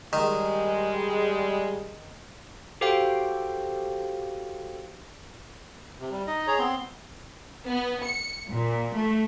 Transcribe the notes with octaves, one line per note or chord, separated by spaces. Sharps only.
D#3 G3 G#3
F#4 G4 A4 C5 F5 G5
C3
G3
D#4 D#5
G#4 C#5 A#5
B3 C4 C6
B3
C#7
A#2
A3